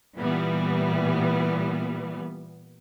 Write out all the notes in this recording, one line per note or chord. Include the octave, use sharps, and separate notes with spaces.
A#2 E3 G3 B3